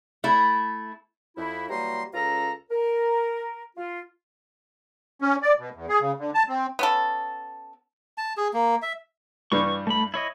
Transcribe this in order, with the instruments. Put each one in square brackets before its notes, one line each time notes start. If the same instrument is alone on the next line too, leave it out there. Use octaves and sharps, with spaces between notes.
[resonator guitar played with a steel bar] A3 E4
[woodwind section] F2 E4
E3 F#3 G3 A#3 A#5 C6
C#2 C#4 F4 A4 A#5
A#4
F4
[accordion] C#4
D5
B2
E2
G#4
C#3
D3
A5
C4
[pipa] B3 C#4 A4
[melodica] A5
G#4
A#3
E5
[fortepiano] G2 E3 G3 [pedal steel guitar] C#6
[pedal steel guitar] A3 B5
E4 C#5 D#5